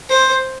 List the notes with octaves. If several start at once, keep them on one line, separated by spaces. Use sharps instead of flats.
C5